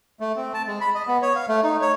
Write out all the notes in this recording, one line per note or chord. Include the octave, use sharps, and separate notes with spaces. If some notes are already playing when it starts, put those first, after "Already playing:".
A3
C4
A5
G#3
B5
D#5
B3
C#5
F5
A3
D#4
C#5